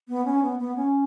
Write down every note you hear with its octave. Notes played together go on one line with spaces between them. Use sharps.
B3
C#4
B3
B3
C#4